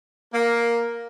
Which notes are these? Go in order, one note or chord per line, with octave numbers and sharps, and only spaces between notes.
A#3